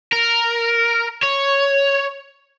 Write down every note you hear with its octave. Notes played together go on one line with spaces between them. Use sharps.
A#4
C#5